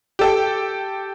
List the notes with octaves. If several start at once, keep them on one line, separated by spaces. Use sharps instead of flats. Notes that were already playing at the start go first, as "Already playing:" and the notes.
G4 A4 G5